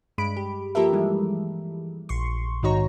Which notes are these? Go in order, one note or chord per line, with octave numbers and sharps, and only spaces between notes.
G2 G#3 B5 D7
G4
F3 A#3 G4 A4 A#4 E5
E3 G3 G#3
A#1 C6 C#6
G#2 D#3 D#4 F#4 C#5 A#5